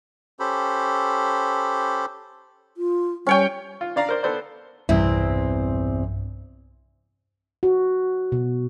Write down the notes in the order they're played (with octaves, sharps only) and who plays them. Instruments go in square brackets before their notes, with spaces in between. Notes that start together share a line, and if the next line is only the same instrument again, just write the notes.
[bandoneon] C#4 G4 A4 C5 B5
[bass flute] F4
[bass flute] G3 [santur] C#4 C#5 G5
[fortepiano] F4
D4 D5 F5 A#5
A#4 C5 D5
B3 A4 C5 D5
[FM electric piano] B1 G2 [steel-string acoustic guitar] E2 C3 C4 [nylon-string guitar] E4
[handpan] F#4
B2